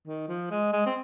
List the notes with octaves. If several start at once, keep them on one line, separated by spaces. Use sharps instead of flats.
D#3
F3
G#3
G#3
C4